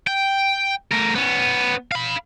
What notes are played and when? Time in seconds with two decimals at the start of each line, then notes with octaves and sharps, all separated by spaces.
0.07 G5
0.91 A3 A#4
1.15 B3 C#4
1.92 F5 B5